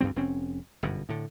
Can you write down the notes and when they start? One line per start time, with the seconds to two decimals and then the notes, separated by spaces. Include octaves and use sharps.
0.01 D2 G2 F#3 C4
0.16 F1 C4 C#4
0.83 G1 F#2 B2
1.09 A2 D3